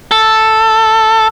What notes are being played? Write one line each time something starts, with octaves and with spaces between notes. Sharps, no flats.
A4